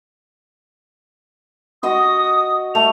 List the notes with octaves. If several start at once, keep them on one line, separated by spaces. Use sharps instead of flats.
F#4 D#5 D#6
A3 F7